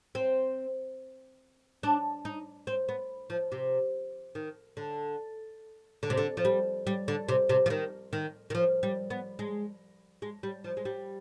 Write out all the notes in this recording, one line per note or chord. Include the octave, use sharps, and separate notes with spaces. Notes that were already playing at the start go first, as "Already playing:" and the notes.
C4
D4
D#4
C4
B3
F3
C3
D#3
D3
D3
C3
D3
F3
G3
G3
D3
C3
C3
F3
D#3
D#3
D#3
F3
G3
B3
G#3
G#3
G3
F3
G#3
G3